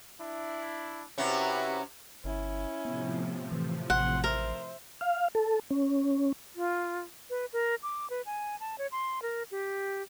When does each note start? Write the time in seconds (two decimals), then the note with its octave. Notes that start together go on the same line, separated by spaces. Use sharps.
0.20 D4 E4
1.18 C3 C#4 E4 F#4 B4
2.24 G1 C#4 E4
2.85 A2 C3 F3 B3
3.52 E3
3.90 A1 F#5 C6
4.24 A#4 C5 E5
5.01 F5
5.35 A4
5.71 C#4
6.56 F4
7.30 B4
7.53 A#4
7.83 D6
8.10 B4
8.26 G#5
8.60 A5
8.78 C#5
8.92 C6
9.22 A#4
9.51 G4